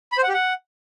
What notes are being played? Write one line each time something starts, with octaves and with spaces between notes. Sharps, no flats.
B5
C5
F#5
G4
F#5